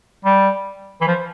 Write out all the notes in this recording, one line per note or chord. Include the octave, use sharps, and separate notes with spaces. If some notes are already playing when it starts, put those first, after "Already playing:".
G3
E3
F3